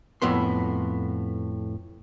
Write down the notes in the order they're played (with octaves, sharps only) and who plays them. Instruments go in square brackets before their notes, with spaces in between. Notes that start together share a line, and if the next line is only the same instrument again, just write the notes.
[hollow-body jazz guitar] F2 A2 B3 C6